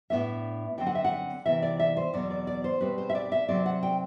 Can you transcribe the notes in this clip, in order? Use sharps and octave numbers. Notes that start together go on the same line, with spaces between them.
A2 F#3 B3 D4 E5
D3 F#3 C4 G5
F#5
E5
F#5
C3 E3 B3 E5
D5
E5
C5
E2 B2 F#3 C4 D5
D5
D5
C5
B2 G3 C4 B4
C5
E5
D5
E5
C3 F#3 C4 D5
F#5
G5